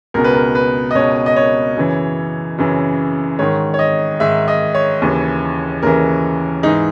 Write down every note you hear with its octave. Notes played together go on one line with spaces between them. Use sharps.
C#2 B2 A#4
B4
A#4
B4
D#5
C#2 B2 C#5
D#5
C#5
F#2 C#3 E3
F#2 C#3 E3
G#2 D#3 C#5
C#5
D#5
G#2 D#3 E5
D#5
C#5
D#2 C#3 E3
D#2 C#3 E3 A#4
G#2 E3 D#4